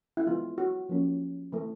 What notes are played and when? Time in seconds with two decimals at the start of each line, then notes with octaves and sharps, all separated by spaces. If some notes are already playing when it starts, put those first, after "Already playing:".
0.17 E4
0.27 E3 G#3 B3 F4
0.58 F#4
0.89 F3 A#3 C#4
1.52 E3 A3 C4